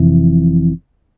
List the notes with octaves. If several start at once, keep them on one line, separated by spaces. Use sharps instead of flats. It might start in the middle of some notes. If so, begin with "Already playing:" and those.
Already playing: F1 F2 C3 E3